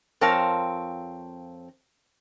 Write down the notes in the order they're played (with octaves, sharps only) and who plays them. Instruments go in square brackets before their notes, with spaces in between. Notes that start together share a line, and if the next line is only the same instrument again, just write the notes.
[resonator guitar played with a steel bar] F2 C4 A#4 C#5 F5 A5